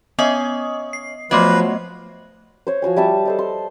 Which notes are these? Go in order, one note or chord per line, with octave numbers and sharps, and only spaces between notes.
B3 C#4 D#5 D#6
C7
F3 F#3 A3 B3 B4 D#5
C5 C#5
F3 F#4 C#5 G#5
G3 E5 A5 D6
A4 C5 D#5
C6